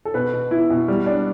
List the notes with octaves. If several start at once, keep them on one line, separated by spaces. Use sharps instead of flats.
A4
B2 B4
B2
E4
B2
G3
D4